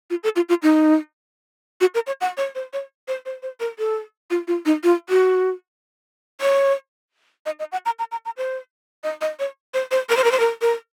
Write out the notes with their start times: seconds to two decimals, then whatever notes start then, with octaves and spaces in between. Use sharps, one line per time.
0.10 F4
0.24 A4
0.36 F4
0.49 F4
0.63 D#4
1.81 F#4
1.95 A#4
2.07 C#5
2.21 F#5
2.37 C#5
2.55 C5
2.73 C#5
3.08 C5
3.26 C5
3.43 C5
3.60 A#4
3.79 A4
4.30 F4
4.48 F4
4.66 D#4
4.84 F4
5.09 F#4
6.41 C#5
7.46 D#5
7.59 D#5
7.72 F#5
7.86 A#5
7.99 A#5
8.12 A#5
8.25 A#5
8.37 C5
9.04 D#5
9.21 D#5
9.39 C#5
9.74 C5
9.91 C5
10.09 A#4
10.17 C5
10.24 A#4
10.31 C5
10.40 A#4
10.61 A#4